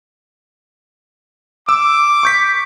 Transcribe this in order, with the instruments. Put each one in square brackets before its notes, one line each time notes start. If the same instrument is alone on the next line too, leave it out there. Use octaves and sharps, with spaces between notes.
[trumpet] D6 [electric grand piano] E6
[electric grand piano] C#6 G6 B6